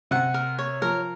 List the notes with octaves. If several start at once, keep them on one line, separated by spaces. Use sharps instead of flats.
C3 F#5
A#4
C#5
F3 A#4